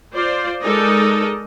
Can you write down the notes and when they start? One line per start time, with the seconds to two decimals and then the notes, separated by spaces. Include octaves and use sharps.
0.14 F4 C5 D5
0.61 G#3 D#4 A4 A#4 D5 D#5